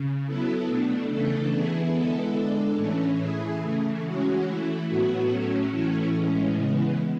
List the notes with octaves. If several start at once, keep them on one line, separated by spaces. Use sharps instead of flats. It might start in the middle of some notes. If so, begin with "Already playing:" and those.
Already playing: C#3
F#3 B3 E4 A4
B2 A3 D4
C#3 E3 A3 D4 A4
E3 B3 E4 G#4
D3 G#3 B3 E4 A4
G#3 D4 A4
A2 E3 A3 C#4 E4
E3 A3 E4 G#4
C#3 E3 A3
E3 G#3 C#4 F#4
E3 A3 E4
A2 F#3 B3 F#4
A2 F#3 A3 C#4
A2 E3 A3 C#4 E4
A2 E3 G#3 C#4
C#3 E3 G#3 B3